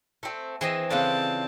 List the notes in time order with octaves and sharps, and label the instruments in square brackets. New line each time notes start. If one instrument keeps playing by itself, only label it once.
[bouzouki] A3 C4
[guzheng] E3 C4 D#5 [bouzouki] G#4
[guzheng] C#3 B4 D5 [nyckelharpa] C4 A5 [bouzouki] D4 F4 A4